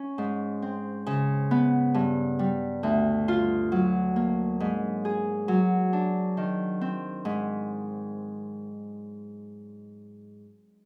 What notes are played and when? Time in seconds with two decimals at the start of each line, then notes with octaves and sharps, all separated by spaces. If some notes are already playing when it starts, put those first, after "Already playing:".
Already playing: C#4
0.18 G#2
0.62 C4
1.06 C#3
1.51 B3
1.94 G2
2.39 G3
2.83 D2
3.28 F4
3.72 F#3
4.16 A#3
4.60 G#2
5.05 G#4
5.48 F#3
5.93 D4
6.37 D#3
6.81 C4
7.25 G#2